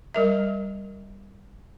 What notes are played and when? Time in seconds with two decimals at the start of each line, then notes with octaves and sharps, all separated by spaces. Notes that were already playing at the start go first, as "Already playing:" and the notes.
0.14 G3 A#4 E5